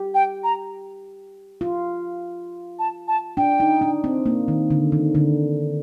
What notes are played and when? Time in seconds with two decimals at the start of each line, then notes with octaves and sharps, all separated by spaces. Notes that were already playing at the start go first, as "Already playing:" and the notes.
Already playing: G4
0.14 G5
0.44 A#5
1.61 F4
2.79 A5
3.08 A5
3.37 D4 G5
3.60 D#4
3.82 D4
4.04 C4
4.26 A#3
4.48 D#3
4.70 D3
4.92 D#3
5.15 D3